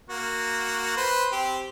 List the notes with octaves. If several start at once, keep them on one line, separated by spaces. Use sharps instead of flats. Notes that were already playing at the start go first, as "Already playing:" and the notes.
A#3 F#4
B4 C5
C4 G4